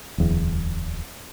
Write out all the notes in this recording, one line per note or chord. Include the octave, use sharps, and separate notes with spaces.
D1 E2